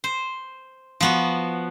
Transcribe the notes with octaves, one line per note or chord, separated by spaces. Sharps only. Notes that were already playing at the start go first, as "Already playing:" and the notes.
C5
F3 B3 F#4